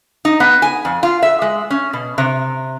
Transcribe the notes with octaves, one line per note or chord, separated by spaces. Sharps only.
D#4
B3
G#5
F2
F4
E5
G#3
C#4
B2
C3